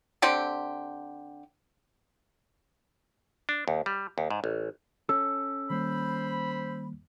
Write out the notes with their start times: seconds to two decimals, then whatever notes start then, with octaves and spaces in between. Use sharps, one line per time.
0.22 D3 C4 G4
3.49 D4
3.68 D#2
3.86 G3
4.18 D#2
4.31 G#2
4.44 A1
5.09 C#4 A4 E6
5.70 D#3 G3 A#3 C5 B5